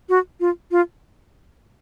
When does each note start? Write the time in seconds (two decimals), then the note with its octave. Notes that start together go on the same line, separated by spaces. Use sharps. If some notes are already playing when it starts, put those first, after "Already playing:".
0.09 F#4
0.40 F4
0.71 F4